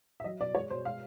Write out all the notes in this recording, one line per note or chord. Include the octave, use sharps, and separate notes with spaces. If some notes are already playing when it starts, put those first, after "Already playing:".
E5
F#3 D#5
B2 D5
G#3 C#5
B2 C5
G#3 F5